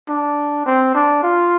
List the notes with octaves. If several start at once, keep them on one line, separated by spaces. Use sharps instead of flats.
D4
C4
D4
F4